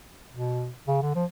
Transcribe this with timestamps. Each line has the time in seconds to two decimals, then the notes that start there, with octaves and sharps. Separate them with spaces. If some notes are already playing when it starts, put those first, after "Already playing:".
0.33 B2
0.88 C#3
1.02 D3
1.15 F3